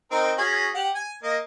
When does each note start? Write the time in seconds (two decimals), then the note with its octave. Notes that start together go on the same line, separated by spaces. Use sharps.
0.11 C4 D#4 A#4
0.38 C#4 F#4 G#4
0.75 G4 F#5
0.95 G#5
1.23 A#3 D#5